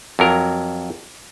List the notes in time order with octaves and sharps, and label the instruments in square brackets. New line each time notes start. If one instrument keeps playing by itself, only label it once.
[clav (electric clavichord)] F2 F#3 A#4